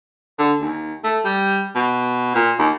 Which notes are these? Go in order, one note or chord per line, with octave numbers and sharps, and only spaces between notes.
D3
D#2
A3
G3
B2
A#2
D#2